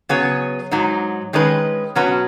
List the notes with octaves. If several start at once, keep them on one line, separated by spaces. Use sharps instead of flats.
C#3 F#3 B3 G#4 C#5
G#2 F#3 D#4
D#3 G#3 C#4 B4 D#5
B2 F#3 C#4 F#4 B4